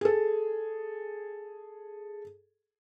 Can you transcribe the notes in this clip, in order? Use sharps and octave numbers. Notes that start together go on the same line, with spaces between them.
G#4 A4